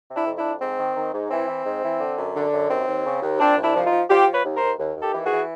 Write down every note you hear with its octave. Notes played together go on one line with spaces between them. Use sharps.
C3
D4 E4
F2
D4 E4
F2
G#2 C4
D#3
D#3
G#2
E3 C4
E3
G#2
E3
D3
F#2
D3
F#2
D#2 C4
D#2
C#3
D#2
A#2 C4 D4
C2
D4 E4
F3
D#4 F4
F3
F3 F4 G4
F3
B4 C#5
D#2
A#4 C5
D#2
D#2
D#2
G4 A4
E3
F#4 G#4
E3